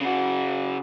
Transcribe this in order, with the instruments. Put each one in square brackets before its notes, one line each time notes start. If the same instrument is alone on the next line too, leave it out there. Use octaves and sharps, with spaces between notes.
[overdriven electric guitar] C#3 F#4